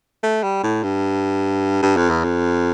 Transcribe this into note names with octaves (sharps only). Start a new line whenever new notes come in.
A3
G3
A2
G2
G2
F2
E2
F2